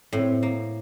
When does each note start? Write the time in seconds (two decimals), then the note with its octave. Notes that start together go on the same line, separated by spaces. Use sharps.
0.12 A2 C4
0.43 A#3